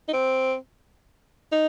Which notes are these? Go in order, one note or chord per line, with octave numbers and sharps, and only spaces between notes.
D#4
C4
D#4